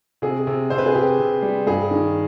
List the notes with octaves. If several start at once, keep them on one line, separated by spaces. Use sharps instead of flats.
C3 G#4
C3
C3 C5
B4
G#4
C3 G4
C3
G3
G2 G#4
D#3